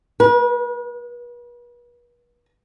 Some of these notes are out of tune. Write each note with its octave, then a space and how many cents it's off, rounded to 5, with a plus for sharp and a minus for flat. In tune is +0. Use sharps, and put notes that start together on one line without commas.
B4 -40